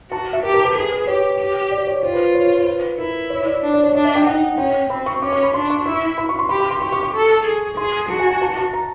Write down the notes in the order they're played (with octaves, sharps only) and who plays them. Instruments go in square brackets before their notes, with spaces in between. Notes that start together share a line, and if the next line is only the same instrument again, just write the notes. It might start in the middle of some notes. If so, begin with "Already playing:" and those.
[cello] F#4 [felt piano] A5
[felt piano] E5
[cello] G4 [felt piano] A#4
[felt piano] A#4
B4
[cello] G#4 [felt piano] B4
[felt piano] B4
[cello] G4 [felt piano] C#5
[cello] G4
[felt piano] D5
C#5
[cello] F4 [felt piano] C5
[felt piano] B4
C#5
C5
C5
B4
[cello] E4 [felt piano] A#4
[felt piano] C#5
D5
[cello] D4
[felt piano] D5
C#5
[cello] D4 [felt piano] D#5
[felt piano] E5
G5
[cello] D#4 [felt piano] F#5
[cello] C#4 [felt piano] G5
[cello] C4 [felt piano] B5
[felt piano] C#6
[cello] C#4 [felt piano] D6
[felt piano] C#6
B5
[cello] D4 [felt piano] C6
[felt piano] C#6
[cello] E4 [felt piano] C#6
[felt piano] B5
C#6
C6
[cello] G4 [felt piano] B5
[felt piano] B5
C6
[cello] G4 [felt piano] C#6
[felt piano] C#6
C#6
[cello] A4
G#4
[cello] G#4 [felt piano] C6
[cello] F#4 [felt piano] A5
[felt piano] G#5
G#5
A5
A5
A#5